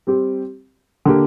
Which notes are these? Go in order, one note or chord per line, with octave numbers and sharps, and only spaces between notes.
G3 C4 G4
D3 A#3 G4